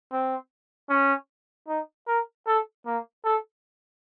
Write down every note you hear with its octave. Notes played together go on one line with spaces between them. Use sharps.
C4
C#4
D#4
A#4
A4
A#3
A4